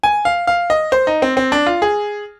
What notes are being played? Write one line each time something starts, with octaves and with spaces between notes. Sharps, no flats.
G#5
F5
F5
D#5
C5
D#4
C4
C4
D4
F4
G#4